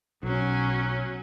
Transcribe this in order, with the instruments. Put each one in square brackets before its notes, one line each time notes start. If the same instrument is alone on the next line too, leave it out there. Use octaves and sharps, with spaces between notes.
[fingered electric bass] B1 [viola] F#3 C#4